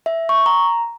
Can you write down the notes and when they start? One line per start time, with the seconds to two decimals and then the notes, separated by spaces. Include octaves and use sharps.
0.06 E5
0.29 C#6
0.46 A#5